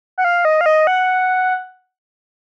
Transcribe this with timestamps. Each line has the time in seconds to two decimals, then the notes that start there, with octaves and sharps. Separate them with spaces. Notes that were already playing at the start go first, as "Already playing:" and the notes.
0.18 F#5
0.25 F5
0.45 D#5
0.61 F5
0.66 D#5
0.87 F#5